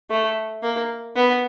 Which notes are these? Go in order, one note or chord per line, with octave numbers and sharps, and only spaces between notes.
A3
A#3
B3